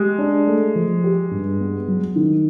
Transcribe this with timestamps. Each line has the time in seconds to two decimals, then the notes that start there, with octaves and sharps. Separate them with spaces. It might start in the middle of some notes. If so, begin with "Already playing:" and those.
Already playing: G#3 G4
0.18 D4
0.47 A3
0.75 F3
1.04 G4
1.31 G2
1.60 B3
1.88 F#3
2.16 D#3